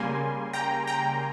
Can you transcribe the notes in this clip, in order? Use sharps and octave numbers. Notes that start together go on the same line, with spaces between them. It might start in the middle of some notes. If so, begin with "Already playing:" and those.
Already playing: C#3 G3 A#3 G#5 C6
G5 A#5
G5 A#5